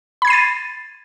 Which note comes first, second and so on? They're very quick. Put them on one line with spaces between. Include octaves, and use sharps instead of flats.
B5 G#6 C7 D#7 A6